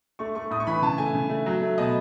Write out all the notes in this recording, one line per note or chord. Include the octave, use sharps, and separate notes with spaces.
A3 C#6
A3 C#6
A2 D#6
C#6
E3 B5
C#3 A5
A3 G#5
C#3
A3
F#3
A3
B2 D#5